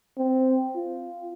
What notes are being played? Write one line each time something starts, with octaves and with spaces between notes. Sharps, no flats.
C4
F4